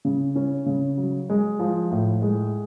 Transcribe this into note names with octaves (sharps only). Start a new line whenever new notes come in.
C#3
C#4
C#3
F#3
G#3
F3
A2
G#3